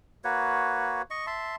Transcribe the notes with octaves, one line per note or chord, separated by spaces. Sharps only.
A#3 F#4 B4 C#5
D#5 C#6
E5 A5 C6